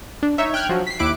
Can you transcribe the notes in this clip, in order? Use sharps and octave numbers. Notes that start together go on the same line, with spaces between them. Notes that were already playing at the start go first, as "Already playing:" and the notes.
D4
D#4 C#5 E5
G5 F6 F#6 G#6
F3 F#3
B6 C7
D#2 E4 D6 F#6 D7